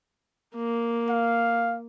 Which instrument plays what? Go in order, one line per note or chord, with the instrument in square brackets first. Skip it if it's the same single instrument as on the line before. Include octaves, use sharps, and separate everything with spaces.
[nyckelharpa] A#3
[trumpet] F5